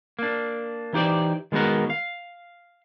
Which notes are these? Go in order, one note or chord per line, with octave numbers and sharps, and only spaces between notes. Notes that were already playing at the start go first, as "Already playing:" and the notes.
A#3 D4
E3 D#4 G4 C5 D5
D#3 G#3 B3 F#4 A#4
F5